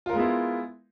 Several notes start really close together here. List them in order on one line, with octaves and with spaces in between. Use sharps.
F4 A#4 G#3 B3 E4